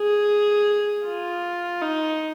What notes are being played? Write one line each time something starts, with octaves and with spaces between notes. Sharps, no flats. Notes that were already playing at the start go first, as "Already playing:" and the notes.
Already playing: G#4
F4
D#4